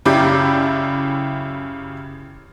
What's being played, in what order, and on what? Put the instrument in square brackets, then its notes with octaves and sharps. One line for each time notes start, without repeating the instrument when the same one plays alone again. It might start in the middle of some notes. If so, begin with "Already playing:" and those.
[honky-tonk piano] F#2 C#3 E4 G4 D5